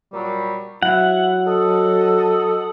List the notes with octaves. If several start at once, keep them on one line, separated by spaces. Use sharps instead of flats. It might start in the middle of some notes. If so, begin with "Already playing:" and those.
A#2 F#3 G3
F#3 E4 F#5
A4 D#5